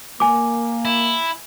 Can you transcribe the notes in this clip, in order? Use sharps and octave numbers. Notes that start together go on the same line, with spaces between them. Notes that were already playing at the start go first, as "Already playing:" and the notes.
A#3 G#5 D6
E4